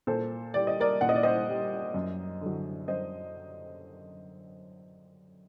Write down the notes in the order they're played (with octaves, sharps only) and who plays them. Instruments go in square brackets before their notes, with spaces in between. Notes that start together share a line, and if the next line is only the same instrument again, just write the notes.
[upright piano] A#2 A4 C5
G3 D5
D#5
A#4 D5
A#2 F#5
D#5
D5
C5 D#5
G3
F#2
D3 F#3
F#2 C5 D#5